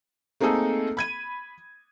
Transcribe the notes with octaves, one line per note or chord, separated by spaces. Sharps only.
A3 A#3 C4 D#4 G#4 A4
B5 G#6 D#7